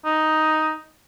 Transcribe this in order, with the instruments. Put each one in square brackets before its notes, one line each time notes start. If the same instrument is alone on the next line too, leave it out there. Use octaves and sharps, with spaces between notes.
[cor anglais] D#4